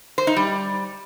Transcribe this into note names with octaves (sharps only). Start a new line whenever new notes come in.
C5
D#4
G3